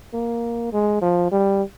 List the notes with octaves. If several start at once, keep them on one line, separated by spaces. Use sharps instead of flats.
A#3
G#3
F3
G3